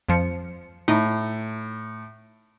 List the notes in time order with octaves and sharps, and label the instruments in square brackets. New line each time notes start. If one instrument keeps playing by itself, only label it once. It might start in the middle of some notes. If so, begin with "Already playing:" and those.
[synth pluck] F2 F3 C#7
[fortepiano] A2 [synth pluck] D#4